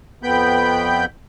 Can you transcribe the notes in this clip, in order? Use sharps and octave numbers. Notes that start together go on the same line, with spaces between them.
F2 B3 G5 B5 G6